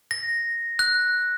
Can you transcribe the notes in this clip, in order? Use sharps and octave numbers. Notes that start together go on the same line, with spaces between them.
A#6
F#6